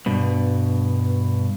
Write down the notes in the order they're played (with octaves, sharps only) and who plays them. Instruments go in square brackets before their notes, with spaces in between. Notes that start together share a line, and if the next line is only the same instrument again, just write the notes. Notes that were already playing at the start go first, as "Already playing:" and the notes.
[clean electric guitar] G2 B2